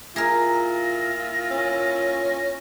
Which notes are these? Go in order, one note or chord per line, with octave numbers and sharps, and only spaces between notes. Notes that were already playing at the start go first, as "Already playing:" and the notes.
A#2 E4 F4 G#4 A#4 A#6
C#4